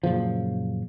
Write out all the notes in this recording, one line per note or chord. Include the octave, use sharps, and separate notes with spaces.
F#2 A#2 C#3 F3